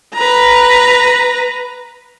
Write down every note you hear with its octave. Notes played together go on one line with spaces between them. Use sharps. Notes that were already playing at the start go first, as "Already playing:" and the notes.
B4 A#5